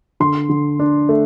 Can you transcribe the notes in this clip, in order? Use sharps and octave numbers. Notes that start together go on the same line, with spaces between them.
D3 C6
D3
D4
A3